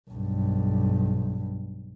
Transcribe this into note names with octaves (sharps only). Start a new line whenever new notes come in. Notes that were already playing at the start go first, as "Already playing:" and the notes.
B1 G2